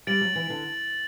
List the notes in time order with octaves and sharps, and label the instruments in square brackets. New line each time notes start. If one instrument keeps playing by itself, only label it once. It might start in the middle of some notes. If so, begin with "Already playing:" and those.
[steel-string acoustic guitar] G3 [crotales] A6 D7 F#7
[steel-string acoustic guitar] F#3
E3
D3